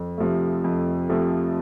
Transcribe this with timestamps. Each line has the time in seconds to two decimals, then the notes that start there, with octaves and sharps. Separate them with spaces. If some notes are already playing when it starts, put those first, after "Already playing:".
Already playing: F2
0.18 C3 F3 A3
0.64 F2
1.09 C3 F3 A3